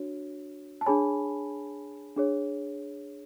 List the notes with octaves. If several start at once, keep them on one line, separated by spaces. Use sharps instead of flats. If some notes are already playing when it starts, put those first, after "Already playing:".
Already playing: D4 F#4 C#5
A5
D4 G#4 C#5 G#5 B5
D4 G#4 C#5